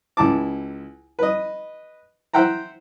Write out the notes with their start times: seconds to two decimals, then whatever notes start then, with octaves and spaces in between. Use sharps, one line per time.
0.17 C#2 E4 A5 D6
1.19 B4 D#5
2.34 C5 E5 F#5 G5 A#5